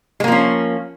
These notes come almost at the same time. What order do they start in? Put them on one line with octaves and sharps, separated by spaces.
G#3 A#3 F3 C#4